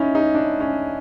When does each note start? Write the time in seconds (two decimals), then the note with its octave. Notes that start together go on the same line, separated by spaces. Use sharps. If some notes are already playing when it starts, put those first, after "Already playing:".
Already playing: C#4 D#4 E4
0.15 D#4
0.35 D4
0.60 C#4